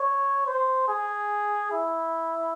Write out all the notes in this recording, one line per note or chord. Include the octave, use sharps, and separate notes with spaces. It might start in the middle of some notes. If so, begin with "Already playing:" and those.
Already playing: C#5
C5
G#4
E4